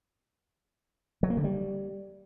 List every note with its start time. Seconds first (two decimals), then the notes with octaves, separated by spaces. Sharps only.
1.23 F#3
1.30 A#3
1.37 D3
1.44 G3